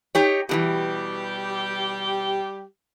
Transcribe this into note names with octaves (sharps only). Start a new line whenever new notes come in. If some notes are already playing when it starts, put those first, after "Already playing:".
D#4 G4 C#5
B2 D#3 E3 G3 G4